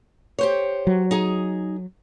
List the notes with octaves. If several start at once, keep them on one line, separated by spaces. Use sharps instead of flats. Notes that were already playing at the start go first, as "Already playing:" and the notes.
G4 C5 C#5
F#3
D#4 G#4